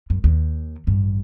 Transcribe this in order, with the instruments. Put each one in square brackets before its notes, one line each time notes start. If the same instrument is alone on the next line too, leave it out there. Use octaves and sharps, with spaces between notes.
[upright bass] F#2
D#2
A1 G2